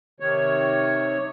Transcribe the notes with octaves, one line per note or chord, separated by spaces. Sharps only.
C3 D#3 C#5